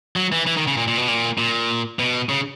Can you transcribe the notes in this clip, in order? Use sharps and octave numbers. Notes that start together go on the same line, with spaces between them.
F#3
E3
E3
D#3
C#3
A#2
A#2
B2
A#2
A#2
B2
C#3